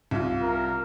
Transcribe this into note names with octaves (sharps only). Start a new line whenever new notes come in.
C2 F4
A#4